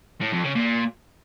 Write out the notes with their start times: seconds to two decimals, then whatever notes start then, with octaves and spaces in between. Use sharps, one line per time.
0.21 A2
0.33 F2
0.44 C#3
0.56 A#2